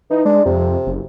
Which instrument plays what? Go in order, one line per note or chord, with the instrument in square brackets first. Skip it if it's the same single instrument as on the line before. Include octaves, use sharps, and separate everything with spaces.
[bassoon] E3 [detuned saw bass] D#4
[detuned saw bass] G#3 [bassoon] D4
[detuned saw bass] F2 [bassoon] C3
[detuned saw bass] F#1